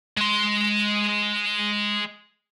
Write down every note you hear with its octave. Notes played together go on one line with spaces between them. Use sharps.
G#3 C6